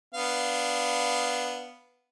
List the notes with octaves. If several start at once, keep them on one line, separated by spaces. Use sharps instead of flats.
B3 D4 F5